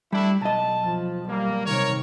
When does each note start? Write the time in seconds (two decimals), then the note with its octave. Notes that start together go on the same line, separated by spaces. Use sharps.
0.13 G3 A3 D4 E4
0.41 B1 D#5 A5
0.84 F3
1.28 G3 A#3
1.66 C3 D#3 A#4 C#5